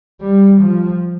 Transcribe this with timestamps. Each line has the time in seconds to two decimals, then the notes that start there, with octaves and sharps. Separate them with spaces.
0.21 G3
0.62 F3